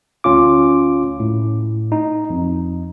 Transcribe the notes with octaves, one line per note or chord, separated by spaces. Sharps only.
D2 C#4 F4 D6
A2
D#4
F2